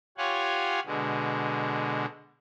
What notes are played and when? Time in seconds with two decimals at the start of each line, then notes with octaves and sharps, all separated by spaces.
0.18 F4 G4 C#5 F5 F#5 G#5
0.86 B2 D3 G#3